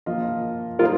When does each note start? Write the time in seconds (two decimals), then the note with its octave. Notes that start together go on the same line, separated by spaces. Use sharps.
0.06 F3 A#3 F4 D#5
0.79 G3 D#4 F4 A#4 C5 D#5